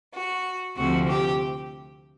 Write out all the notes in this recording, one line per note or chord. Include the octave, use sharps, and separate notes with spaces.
F#4
D2 C3 F3 A3 C4 F#4
G4